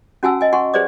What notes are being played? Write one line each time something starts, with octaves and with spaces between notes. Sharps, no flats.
C#4 F#4 F#5 G#5 A5 E6
D#5 G#5
F#5 G#5 C6 C#6
G#4 B4 C5 D5 D6